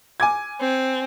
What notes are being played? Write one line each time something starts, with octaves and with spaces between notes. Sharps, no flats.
G#5 D6 G#6
C4